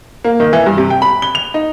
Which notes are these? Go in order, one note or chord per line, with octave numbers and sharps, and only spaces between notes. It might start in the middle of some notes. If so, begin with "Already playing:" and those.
A#3
D#3
E3
G2
C3
G5
B5
G7
F7
D#4